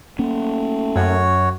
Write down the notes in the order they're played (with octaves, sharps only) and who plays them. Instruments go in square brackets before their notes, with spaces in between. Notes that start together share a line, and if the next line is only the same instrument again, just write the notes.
[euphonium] A3 [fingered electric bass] A#3 C#4
[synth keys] F#2 [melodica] F#4 C#5